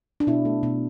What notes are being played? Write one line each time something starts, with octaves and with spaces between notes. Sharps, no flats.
D4
B2 E4
A3
B2